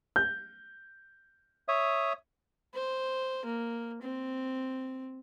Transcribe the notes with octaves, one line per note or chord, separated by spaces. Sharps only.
G6
C#5 E5 D#6
C5
A#3
C4